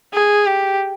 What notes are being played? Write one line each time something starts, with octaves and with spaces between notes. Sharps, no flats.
G#4
G4